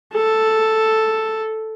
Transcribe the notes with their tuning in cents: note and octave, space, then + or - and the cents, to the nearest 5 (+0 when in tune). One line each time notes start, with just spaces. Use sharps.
A4 +0